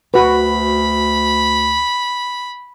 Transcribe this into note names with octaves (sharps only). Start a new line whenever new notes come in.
D2 F#4 B4 B5